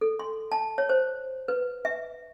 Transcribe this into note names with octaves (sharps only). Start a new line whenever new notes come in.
A4
C6
A5
C#5
C5
B4
E5